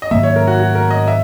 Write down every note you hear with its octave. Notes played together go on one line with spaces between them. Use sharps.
D#5
G#2 D#3 F#3 A#3 E5
C#5
A#4
F#4
F#4
A#4
D#5
E5